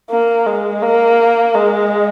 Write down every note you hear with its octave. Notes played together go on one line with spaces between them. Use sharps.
A#3
G#3
A#3
G#3